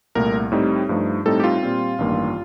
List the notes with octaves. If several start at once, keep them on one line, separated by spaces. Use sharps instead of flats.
C2 A#2 A3 A#4
A2 G3 C4 D#4
G2 F3 A3 D#4
A2 G3 C4 D#4 A4
G4
F4
A#2 G3 C4
A1 G2 D#3 A#3